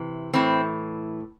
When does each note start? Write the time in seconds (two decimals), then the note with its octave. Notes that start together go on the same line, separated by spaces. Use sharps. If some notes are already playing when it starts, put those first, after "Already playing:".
Already playing: C3 E3
0.33 A2 E3 C4